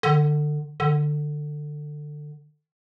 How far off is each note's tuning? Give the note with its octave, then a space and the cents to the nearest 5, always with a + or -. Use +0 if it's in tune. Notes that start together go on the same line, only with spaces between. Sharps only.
D3 +25
D3 +20